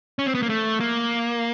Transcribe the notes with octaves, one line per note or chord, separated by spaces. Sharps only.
C#4
C4
B3
A#3
A3
A#3